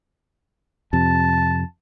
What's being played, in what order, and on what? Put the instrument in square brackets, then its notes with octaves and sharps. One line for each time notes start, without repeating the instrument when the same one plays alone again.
[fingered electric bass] F2 C3 [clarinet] A5